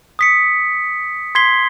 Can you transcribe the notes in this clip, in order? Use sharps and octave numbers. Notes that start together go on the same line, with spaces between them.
D#6 B6 C#7
C6 G#6 B6 C7 G7